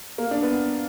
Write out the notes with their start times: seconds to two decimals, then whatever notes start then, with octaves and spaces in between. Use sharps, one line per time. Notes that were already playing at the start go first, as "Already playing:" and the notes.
0.18 A#3
0.31 D4
0.43 B3